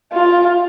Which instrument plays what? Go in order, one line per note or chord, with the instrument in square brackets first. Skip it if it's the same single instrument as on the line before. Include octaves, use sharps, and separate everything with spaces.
[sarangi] F4